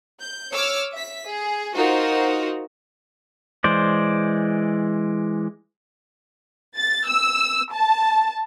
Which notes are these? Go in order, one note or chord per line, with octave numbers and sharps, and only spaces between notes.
G6
C#5 D6 E6 F6
E5 B6
G#4
D#4 F4 F#4 A#4 C5
E3 G#3 C5 D5
A6
E6
A5